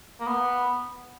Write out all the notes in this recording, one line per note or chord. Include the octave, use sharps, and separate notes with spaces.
A#3
B3